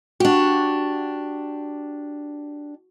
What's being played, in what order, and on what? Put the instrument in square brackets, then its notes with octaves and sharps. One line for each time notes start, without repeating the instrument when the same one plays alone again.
[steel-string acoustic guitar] D4 G4 [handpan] F#4